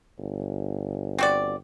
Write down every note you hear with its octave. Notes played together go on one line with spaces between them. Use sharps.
G1
C4 F#4 D5